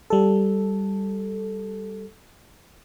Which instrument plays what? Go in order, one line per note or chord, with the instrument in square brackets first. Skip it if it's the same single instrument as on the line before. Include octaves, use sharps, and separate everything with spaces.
[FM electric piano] G3 A4